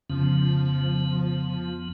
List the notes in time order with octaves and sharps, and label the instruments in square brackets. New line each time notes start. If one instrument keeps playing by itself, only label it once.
[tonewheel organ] F2 B3 [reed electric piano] C#3 [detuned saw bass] F3